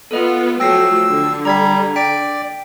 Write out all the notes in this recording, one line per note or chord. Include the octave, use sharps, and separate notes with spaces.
B3 F4 A4 D#5
F3 F#3 A3 G5 E6 A#6 C7
D3
G3 A#5 G#6 B6
D5 G5 B6 D7